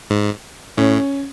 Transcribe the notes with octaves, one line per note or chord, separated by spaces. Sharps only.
G#2
A2 C#4